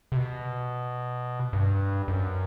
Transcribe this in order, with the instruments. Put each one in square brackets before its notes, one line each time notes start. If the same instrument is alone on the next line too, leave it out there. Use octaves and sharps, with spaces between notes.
[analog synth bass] C3
B2
G2
F#2